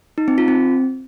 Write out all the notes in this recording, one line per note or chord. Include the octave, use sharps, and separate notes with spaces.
D#4
C4
F4
C4